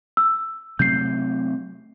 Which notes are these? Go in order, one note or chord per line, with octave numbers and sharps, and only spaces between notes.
E6
C3 F#3 A3 G6 C7